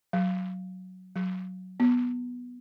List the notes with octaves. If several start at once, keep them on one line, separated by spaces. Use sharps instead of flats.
F#3
F#3
B3